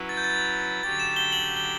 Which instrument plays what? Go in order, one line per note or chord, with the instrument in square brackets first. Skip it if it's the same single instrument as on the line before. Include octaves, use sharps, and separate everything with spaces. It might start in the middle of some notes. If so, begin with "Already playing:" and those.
Already playing: [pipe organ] F#3 C#4 E4 B4
[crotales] A6
G6
A6
[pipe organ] D3 F#3 C#4 G4 [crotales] A6
[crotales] E7
G7
F#7
G7